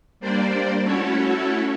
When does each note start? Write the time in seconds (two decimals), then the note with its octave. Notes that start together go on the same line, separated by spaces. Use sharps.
0.20 G3 A#3 D4 C5 D5
0.83 A3 C#4 E4 F#4 A4 C#5